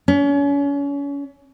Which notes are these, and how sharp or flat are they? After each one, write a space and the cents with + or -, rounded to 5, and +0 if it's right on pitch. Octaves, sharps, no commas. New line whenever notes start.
C#4 +35